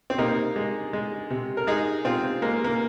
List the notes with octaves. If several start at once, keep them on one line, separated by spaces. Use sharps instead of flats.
C4
C3 A#3 D#4
G#3
G#3
C3
A#4
G#3 D#4 G#4
C3 C4 F4
G#3 A#3
A#3